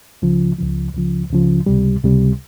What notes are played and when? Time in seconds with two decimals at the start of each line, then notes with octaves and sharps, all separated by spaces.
0.22 C#2 C#3 F3
0.59 C#2 C#3 F3
0.94 C#2 C#3 F3
1.30 C#2 C#3 F3
1.66 C#2 C3 G3
2.03 C#2 C3 G3